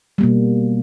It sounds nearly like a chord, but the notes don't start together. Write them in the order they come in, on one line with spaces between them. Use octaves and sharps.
G3 A#3 B2